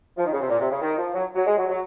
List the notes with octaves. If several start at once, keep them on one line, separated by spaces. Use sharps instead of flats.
F3
D#3
C#3
C3
A#2
C3
C#3
D#3
F3
F#3
F#3
G#3
F#3
F#3